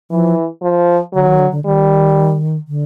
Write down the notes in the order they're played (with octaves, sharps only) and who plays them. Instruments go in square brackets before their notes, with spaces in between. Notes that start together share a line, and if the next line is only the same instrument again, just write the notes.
[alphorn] E3 [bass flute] F3
[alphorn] F3
[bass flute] D3 [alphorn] F#3
[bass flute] D#3
D3
D3
[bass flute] D#3 [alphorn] G3
[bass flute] D3